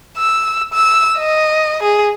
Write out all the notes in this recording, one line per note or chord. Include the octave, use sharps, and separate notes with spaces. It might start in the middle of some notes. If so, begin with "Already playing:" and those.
E6
E6
D#5
G#4